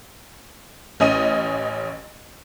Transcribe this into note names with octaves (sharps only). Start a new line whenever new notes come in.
A1 C#4 D#5 D#7